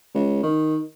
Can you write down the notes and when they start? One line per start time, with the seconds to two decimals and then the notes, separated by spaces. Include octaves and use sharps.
0.15 C#2
0.43 D#3